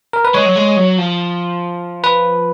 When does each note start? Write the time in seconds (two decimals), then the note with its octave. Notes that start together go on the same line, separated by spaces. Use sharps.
0.13 A#4
0.25 B4
0.34 G#3 C#5
0.46 F#3
0.55 G#3
0.77 F#3
0.98 F3
2.04 B4